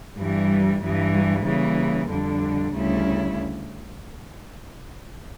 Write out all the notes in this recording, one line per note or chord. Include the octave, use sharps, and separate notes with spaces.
G2 E3 G3
G2 E3 G3
C#3 E3 G3 A#3
F2 D3 G3 D4
D2 C#3 G3 C#4 E4